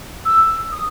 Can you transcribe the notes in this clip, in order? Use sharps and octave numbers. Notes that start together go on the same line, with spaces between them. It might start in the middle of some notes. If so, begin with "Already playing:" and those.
E6
D#6